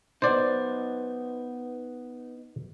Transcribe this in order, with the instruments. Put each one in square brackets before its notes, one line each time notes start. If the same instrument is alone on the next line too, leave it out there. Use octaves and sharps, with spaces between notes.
[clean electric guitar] B3 D#4 [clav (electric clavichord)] C5 D5